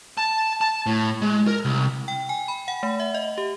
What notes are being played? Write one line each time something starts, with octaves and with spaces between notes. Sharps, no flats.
A5
A5
A2
G#3
A#4
C2
G5
G#5
B5
F#5
A3
E5
D#5
G4